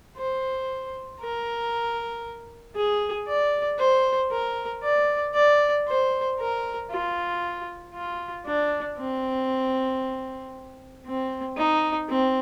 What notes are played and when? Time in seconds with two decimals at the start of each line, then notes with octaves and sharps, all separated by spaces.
0.17 C5
1.20 A#4
2.76 G#4
3.28 D5
3.79 C5
4.31 A#4
4.83 D5
5.34 D5
5.87 C5
6.39 A#4
6.91 F4
7.94 F4
8.46 D4
8.99 C4
11.06 C4
11.58 D#4
12.09 C4